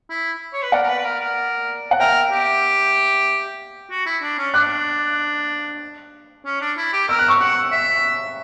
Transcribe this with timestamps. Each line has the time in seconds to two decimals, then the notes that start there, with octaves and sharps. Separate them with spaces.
0.10 E4
0.53 C#5
0.63 B4
0.72 A#4 D5 F#5
0.83 A#4
0.88 B4
0.99 B4
1.05 A#4
1.20 A#4
1.91 F#5
2.00 A#4 E5 G5
2.32 G4
3.91 F#4
4.06 E4
4.22 D4
4.38 C#4
4.54 D4 D6 F#6
6.46 C#4
6.61 D4
6.77 E4
6.93 G4
7.08 A#4 E6
7.19 F#6
7.28 C#6 E6
7.40 F#5
7.72 E5